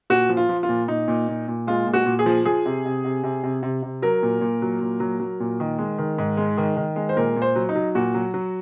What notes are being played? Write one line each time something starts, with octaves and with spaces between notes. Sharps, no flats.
A#2 F#4
F3
F4
F3
F4
A#2
A#2 D#4
A#2
A#2
A#2
G#3 F4
A#2
F#4
A#2
G#4
F3
F3 G#4
C3
C3
C3
C3
C3
C3
C3
F#3 A#4
A#2
A#2
F#3
A#2
F#3
F#3
A#2
D#3
G#3
D#3
G#2
G#3
D#3
D#3
G#3
C5
A#2 A#4
A#2
C5
F#3
D#4
F#3
A#2 F#4
F#3
F#3